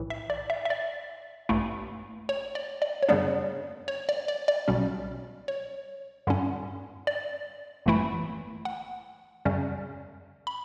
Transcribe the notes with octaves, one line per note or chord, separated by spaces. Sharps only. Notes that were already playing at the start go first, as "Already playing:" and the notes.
Already playing: B1 A2 E3
E5
D5
E5
E5
D5
A1 G2 E3 A3 E4
C#5
D5
D5
C#5
F#2 C#3 G3 B3 D4 D5
C#5
D5
D5
D5
B1 B2 G3 C#4
C#5
G2 D3 G3 C#4
D5
G1 F#2 E3 A3 E4
F#5
F#2 C#3 G3 C#4
B5